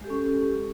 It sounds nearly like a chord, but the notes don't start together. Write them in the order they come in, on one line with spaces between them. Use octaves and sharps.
G#3 G4 A4 C#4